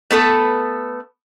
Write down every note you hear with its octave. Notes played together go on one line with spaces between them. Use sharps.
A3 B3 A4 B4